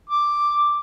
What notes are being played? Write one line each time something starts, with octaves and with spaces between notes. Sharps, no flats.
D6